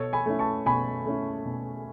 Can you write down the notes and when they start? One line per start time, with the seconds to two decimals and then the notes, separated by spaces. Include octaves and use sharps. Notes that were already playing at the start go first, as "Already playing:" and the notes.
Already playing: B2 A4 C#5
0.13 G#5 B5
0.26 A3 C#4 E4
0.39 A5 C#6
0.66 B2 G#5 B5
1.06 A3 C#4 E4
1.45 B2